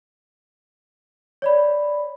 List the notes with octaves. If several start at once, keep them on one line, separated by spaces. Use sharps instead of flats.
C#5 D5 B5